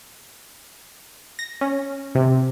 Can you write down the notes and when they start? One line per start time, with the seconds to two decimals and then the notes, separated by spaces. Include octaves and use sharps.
1.39 A#6
1.61 C#4
2.15 C3